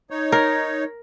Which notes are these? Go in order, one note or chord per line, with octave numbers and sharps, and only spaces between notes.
D#4 C#5
A#4